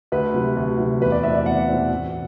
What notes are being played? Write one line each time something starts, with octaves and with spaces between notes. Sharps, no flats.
D2 B4
C3 F#3
D2
C3 F#3
E2 B4
D5
B2 A3 C4 E4 E5
D5
E2 F#5
B2 A3 C4 E4
A1